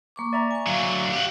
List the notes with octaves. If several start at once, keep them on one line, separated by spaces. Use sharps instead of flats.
A#3 C#6 D6
D5 E5 A#5
G#5 C#6
D3 F#3 F5
G4 F#5